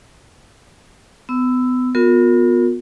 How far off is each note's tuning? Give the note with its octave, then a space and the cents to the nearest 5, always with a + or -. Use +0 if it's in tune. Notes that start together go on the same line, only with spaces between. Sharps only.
B3 +35 E6 +0
B3 +0 F4 +45 A#4 -20